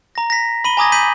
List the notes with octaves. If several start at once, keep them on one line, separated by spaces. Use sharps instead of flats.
A#5 A#6
A#6 B6
B5 D#7 G7
G#5 A#5 D6 D#6 G#6 A#6
G6 B6 D#7 F#7